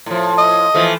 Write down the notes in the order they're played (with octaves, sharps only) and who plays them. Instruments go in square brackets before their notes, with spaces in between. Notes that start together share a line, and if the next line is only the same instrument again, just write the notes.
[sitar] A2 F3
[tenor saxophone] D#5
[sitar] E3 F3 A3